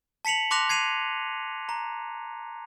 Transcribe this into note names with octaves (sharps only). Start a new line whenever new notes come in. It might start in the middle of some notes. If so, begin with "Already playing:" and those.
A5 B6 C#7 F7 F#7
A5 C6 D6 F#6 A#6 F7
G#6 C7 D#7 F7
A#5